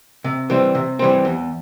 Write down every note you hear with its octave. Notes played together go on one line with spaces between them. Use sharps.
C3
E3 G3 C4
C3
E3 G3 C4
E2